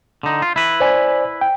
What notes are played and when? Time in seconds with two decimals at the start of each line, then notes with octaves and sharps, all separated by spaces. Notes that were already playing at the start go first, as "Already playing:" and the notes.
0.23 D3 D#4
0.42 F4
0.56 E4 B4
0.80 C5 D5 G#5
1.41 G5